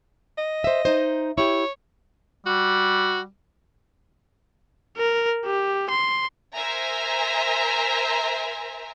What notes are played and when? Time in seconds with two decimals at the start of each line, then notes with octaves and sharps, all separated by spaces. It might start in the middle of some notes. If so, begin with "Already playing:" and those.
0.38 D#5
0.64 C5 E5
0.85 D#4 C5
1.38 E4 G4 C#5
2.46 G3 F#4
4.97 A#4
5.45 G4
5.90 C6
6.55 A#4 C5 E5 G#5 A#5